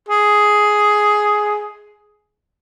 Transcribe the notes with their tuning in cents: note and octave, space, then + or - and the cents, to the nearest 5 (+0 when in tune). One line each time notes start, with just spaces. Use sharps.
G#4 +5